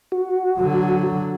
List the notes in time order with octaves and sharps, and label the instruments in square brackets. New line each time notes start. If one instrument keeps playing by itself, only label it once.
[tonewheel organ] F#4
[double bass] D3 F#3